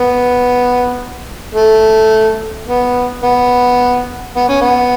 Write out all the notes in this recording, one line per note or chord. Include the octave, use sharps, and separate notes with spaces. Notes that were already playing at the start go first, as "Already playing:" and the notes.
Already playing: B3
A3
B3
B3
B3
C#4
B3